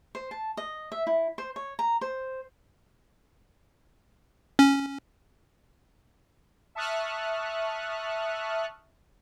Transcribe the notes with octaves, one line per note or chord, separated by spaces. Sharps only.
C5
A5
D#5
E5
E4
C5
C#5
A#5
C5
C#4
E5 A5 C#6 D#6 F6 F#6